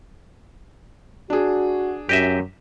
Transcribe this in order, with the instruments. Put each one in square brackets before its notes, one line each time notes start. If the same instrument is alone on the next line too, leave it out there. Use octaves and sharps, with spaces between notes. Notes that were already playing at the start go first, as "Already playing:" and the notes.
[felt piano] D4 G#4 [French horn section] F#4
[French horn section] F#2 [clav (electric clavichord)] G4 D#5 E5